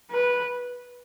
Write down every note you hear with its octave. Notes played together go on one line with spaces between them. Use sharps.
B4